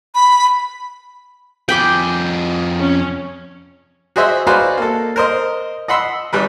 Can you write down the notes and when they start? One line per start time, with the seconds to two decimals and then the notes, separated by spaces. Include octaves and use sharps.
0.15 B5
1.69 F2 G#4 G5 B5 D6
2.79 C#4
4.16 F#4 G#4 C5 D#5 E5
4.47 F#4 G#4 B4 C5 D5 F5
4.77 A#3 A4
5.16 A#4 C5 D#5
5.88 D#5 F#5 B5 C6 E6
6.33 G#1 G3 B4